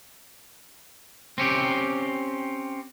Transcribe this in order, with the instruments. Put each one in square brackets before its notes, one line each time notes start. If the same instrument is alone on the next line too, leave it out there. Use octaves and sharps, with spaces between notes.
[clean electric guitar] C4 C#4 G4